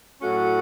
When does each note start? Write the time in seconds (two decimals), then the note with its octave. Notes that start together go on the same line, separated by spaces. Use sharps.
0.21 A2 F#3 A3 C#4 F#4